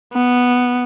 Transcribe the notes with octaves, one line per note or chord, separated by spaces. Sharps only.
B3